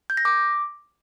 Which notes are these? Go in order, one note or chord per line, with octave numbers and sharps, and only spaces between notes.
G6
A#6
D6